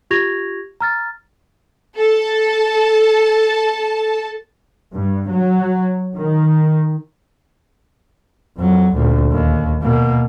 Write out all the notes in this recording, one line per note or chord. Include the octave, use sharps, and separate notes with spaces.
F4 G4 C#6 G#6 A#6 F7
A#5 F6 A6
A4 A5
G2
F#3
D#3
F2 F#3
D2 A#2
D#2
B2 A#3